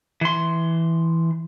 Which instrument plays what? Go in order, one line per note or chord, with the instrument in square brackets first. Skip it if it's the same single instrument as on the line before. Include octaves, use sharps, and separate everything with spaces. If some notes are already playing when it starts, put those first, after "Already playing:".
[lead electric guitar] E3 C6